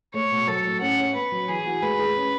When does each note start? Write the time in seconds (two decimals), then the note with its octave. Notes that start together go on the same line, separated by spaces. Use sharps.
0.14 A3 C#5
0.31 B2
0.47 F#3 A4
0.64 A2
0.81 C#4 F#5
0.98 C#5
1.15 B3 B4
1.32 F#3
1.48 E3 G#4
1.66 F#4
1.82 G#3 B4
1.99 G#4
2.16 C#4